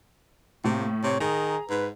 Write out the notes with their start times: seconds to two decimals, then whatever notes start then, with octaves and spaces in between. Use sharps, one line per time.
0.64 A2 C3 A#3
1.03 C3 C#5
1.20 D#3 G#4 A#5
1.69 G#2 B4